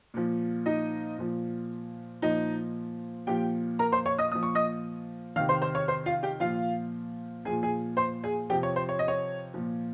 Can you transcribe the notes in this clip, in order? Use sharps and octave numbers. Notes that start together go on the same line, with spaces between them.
A#2 F3
D#4 D#5
A#2 F3
A#2 F3 D#4 D#5
A#2 F3 G4 G5
A#4 A#5
C5 C6
C#5 C#6
D#5 D#6
A#2 F3 D#6
C#6
D#5 D#6
C3 D#3 F5 F6
C5 C6
C5 C6
C#5 C#6
C5 C6
F4 F5
G4 G5
A#2 F3 F4 F5
A#2 F3 G#4 G#5
G#4 G#5
C5 C6
G#4 G#5
C3 F3 G4 G5
C#5
C5
C#5
D#5
C#5
A#2 F3